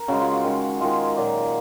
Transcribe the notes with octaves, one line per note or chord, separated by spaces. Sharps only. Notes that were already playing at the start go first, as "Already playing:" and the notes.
Already playing: A#4
C#3 G#3 F#4
F4
F#4
D#3 G#3
D#3 G#3 F4
A#2 F#3 A#3